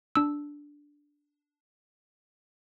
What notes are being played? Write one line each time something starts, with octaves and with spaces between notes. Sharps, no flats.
D4 E6